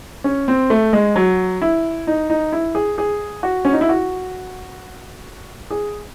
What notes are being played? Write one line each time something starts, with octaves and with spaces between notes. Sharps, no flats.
C#4
C4
A3
G#3
F#3
E4
D#4
D#4
E4
G#4
G#4
F#4
C#4
D#4
E4
F#4
G#4